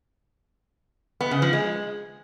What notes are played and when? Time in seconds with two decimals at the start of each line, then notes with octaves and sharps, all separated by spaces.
1.21 B3
1.31 C#3
1.42 F3
1.53 G#3